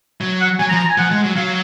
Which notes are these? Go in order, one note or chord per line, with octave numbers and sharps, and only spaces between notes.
F#3
F#5
F#3 G#5
A#5
F3
A#5
G#5
F3 F#5
G#3
F#3
F#3 F5